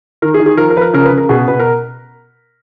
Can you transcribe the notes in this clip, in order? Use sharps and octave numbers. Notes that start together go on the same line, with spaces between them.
D#3 A#4
G#4
D#3
G#4
F3 A#4
A#4
F3 B4
A#4
C#3 A#4
B4
C#3
A#4
B2 G#4
B2 B4
A#4